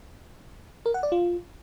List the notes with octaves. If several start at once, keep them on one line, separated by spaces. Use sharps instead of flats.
A#4
F#5
D5
F4